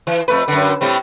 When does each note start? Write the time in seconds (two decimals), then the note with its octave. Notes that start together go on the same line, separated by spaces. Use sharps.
0.07 E3
0.28 F2 A3 B4
0.48 F#2 D3
0.81 A2 G3 C4